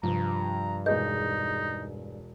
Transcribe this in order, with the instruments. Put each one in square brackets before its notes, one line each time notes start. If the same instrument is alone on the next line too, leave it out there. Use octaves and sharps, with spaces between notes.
[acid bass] G2 [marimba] C3 [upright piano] F3 [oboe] A#5
[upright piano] E1 G#4 [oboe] D#4 [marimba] B4 D#5 G6